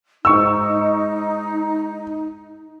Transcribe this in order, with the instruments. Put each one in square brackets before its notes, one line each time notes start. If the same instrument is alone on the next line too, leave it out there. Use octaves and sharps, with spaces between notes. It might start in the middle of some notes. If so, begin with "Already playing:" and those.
[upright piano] G#2 C#6 E6 [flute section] D#4